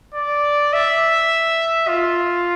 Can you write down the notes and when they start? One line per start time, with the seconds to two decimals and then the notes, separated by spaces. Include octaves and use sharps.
0.14 D5
0.73 E5
1.88 F4